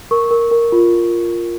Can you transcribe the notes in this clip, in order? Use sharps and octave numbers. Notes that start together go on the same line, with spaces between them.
A#4 C#6
A#4
A#4
F4